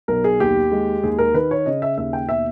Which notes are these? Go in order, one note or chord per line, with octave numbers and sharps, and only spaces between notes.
B1 A#4
G#4
D#2 G4
G#3
D#2 G#4
A#4
D#3 B4
C#5
C#3 D#5
E5
D#2 E5
G5
B2 E5